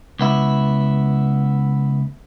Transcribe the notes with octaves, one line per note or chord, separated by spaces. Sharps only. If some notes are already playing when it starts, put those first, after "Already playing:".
C#2 B3 E4